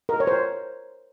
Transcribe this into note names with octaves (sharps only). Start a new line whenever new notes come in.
A#4
C#5
C5